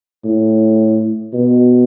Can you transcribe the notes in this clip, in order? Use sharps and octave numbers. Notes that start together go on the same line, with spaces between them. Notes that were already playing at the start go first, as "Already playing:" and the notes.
A2
B2